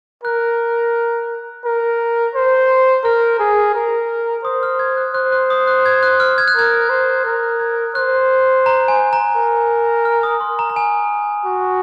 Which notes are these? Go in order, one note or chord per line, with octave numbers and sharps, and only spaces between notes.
A#4 F#6
A#4
C5
A#4 F6
G#4
A#4
C5 D#6
F6
G#6
F#6
C5 F#6
F#6
D#6
F#6
G#6
F#6
F6
G#6
F#6
A#4 G#6
C5
A#4 G#6
G#6
C5 F#6
A#5
G#5
A#5
A#4
F6
D#6
C6
A#5
A#5
G#5
F#4